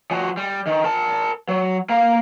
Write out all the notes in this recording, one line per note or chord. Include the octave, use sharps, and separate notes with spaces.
F3 F#4
G3
D#3
A#4 A5
F#3
A#3 F5